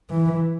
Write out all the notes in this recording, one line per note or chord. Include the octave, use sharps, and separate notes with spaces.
E3